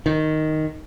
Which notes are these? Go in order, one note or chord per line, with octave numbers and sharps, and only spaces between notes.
D#3